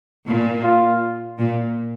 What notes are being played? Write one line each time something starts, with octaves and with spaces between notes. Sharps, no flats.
A#2
F4
A#2